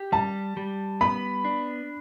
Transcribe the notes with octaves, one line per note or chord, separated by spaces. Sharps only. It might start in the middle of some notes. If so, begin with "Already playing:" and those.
Already playing: G4
G3 A5
G3
B3 B5
D4